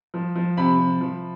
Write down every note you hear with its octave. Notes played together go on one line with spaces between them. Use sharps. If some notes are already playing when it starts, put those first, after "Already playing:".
F3
F3
C3 B5
C3
F3